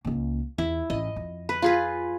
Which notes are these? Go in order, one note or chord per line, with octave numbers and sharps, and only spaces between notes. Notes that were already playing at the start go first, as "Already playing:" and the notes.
C#2 A#3
E2 E4
A1 D#5
F2
B4
F4 G#4 B4